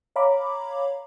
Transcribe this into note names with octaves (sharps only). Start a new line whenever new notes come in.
C#5 F5 A#5 B5 D6